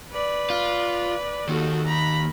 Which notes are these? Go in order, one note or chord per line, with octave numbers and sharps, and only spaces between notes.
B4 D5
F4
D#2 D#3 F#4 A4
A#5 B5